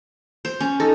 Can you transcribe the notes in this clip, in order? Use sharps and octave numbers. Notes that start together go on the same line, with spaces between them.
C5
C#4
D#4 A4